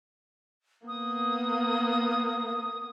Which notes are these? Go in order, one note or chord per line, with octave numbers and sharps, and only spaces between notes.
A#3 B3 D#6